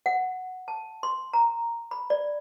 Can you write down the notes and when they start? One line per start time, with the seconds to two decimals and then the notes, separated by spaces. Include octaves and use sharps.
0.06 F#5
0.68 A5
1.03 C6
1.33 A#5
1.91 B5
2.10 D5